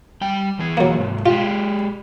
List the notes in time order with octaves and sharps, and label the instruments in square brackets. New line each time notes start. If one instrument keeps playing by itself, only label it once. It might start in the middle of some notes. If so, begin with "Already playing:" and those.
[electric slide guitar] G3 G5
E2 E3 G#4
[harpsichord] F#3 A#3
[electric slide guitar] G#2 C3
[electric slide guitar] G#3 G4 [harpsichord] F4